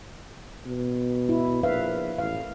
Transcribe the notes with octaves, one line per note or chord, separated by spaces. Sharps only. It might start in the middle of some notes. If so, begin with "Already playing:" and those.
B2
E4
A#1 B4 E5 F5
A1 F5